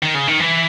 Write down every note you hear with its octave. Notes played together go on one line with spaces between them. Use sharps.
D#3
C#3
D#3
E3